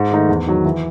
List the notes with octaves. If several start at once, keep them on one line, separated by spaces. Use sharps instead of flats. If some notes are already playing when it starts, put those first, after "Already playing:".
Already playing: G#2
D#3 A3 D#4
E2
D#3 F#3
E3